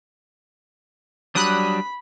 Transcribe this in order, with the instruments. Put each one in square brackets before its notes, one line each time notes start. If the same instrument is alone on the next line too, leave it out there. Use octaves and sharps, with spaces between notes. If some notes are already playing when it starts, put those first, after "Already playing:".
[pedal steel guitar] F#3 G3 D4 [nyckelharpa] B5 [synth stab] D#6 F#6